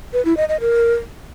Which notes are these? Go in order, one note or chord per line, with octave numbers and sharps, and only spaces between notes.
B4
E4
D#5
D#5
A#4